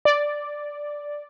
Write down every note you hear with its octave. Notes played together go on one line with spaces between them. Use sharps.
D5